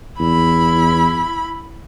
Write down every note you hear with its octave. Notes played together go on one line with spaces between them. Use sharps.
E2 E4 B5